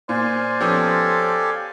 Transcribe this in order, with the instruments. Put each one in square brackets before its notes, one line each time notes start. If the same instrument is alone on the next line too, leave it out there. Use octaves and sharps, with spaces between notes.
[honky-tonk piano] A#2 [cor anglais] C5 [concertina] D5 F5 G#5
[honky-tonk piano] F3 B3 C#4 [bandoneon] G4 A4